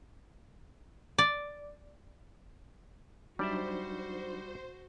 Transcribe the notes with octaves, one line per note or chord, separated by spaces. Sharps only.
D5
F#3 G3 D4 D#4 F#4 C5 D5 E5